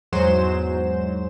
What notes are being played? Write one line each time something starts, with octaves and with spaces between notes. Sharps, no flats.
E2 G#2 F#3 G#3 C5 E7